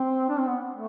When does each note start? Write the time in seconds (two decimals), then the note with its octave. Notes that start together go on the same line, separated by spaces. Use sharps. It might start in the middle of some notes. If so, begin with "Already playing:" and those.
Already playing: C4
0.29 D4
0.38 C4
0.47 B3
0.73 A3